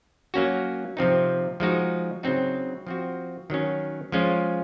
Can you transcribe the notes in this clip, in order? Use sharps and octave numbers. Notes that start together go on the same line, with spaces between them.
F#3 A#3 C#4 F#4
C3 F3 C4 D#4
F3 G#3 D#4 F#4
C#3 F#3 C4 D#4 F#4
F3 C4 F#4
D#3 F#3 C#4
F3 G#3 C#4 F4